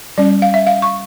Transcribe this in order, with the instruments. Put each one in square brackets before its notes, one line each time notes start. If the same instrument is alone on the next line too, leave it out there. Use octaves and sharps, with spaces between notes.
[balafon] G3 C#4 D5
F5
E5
F5
C#6